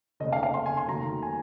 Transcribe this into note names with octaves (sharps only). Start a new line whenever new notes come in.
F1 D#2 C#3 D#5
F5
F5
C6
G#5
C6
F1 D#2 D#3 F#3 A#5
G#5